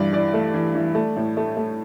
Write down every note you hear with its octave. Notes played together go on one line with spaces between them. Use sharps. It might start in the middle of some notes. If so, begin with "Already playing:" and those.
Already playing: G2 E3 D5
E3 D5
A3
E3
E3
A3
A2
A3
A3